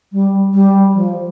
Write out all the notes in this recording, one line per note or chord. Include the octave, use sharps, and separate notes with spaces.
G3
G3
F3